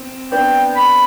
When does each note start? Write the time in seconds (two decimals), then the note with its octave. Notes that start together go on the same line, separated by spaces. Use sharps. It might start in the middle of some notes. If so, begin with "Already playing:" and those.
Already playing: C4
0.32 B3 D4 G5
0.76 B5